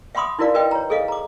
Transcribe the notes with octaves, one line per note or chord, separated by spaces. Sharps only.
E5 F#5 B5 C6 D6 D#6
D#4 E4 F#4 A#4 D5 F5
F#4 A#4 B4 D#5 E5 G5
C#5 A#5
G#4 A4 D#5 F5
A#5 D6